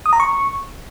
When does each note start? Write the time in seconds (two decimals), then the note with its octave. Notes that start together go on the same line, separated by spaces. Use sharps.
0.06 D#6
0.13 A#5
0.20 C#6